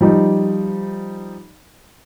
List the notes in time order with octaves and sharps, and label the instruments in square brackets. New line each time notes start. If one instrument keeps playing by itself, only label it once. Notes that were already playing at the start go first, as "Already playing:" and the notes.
[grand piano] F3 G3 D#4